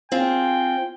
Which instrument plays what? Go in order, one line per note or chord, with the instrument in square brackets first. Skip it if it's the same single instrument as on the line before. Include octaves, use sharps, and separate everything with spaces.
[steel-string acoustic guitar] C4 F4 G#4 [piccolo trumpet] G5